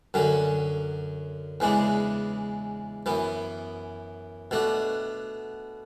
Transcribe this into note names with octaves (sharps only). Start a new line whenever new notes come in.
F#2 D3 F#3 C#4
E2 C#3 E3 G#3 D4
F#2 E3 B3
B2 A3 D4 F#4